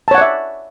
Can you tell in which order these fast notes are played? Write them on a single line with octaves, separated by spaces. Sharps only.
A5 C#5 F#5 D5 E5